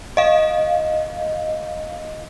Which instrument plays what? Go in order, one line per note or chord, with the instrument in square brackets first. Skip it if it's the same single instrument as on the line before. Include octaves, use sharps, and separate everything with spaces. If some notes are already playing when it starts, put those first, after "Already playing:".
[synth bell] D#5 F5